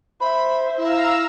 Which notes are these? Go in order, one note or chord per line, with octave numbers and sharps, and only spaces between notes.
C5 E5 B5
E4 F5 A#5 E6